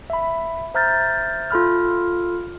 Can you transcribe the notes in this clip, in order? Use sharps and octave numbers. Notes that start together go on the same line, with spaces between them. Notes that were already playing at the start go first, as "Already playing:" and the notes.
E5 B5
C5 E5 A#5 F6 G6 A6
F4 A4 B5 F6